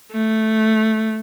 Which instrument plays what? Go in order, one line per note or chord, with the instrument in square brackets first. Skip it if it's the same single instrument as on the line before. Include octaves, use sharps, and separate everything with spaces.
[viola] A3